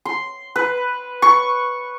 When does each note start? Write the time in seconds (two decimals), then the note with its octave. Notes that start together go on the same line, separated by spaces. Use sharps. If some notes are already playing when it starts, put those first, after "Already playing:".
0.05 C6
0.56 B4
1.22 C#6